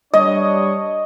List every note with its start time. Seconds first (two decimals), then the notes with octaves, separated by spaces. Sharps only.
0.14 G3 D4 C#5 D#5